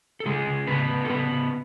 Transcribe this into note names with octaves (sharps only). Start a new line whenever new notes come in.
A4
C#3 G#3 G#4
C#3
C#3 B3 B4
C#3
A4
C#3 B3 B4
C#3